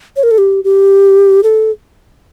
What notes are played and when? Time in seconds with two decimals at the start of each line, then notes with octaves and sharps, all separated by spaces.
0.16 C#5
0.23 A#4
0.31 A4
0.38 G4
0.64 G4
1.43 A4